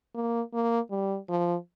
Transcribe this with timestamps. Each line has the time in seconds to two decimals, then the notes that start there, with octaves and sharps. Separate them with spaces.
0.15 A#3
0.53 A#3
0.91 G3
1.29 F3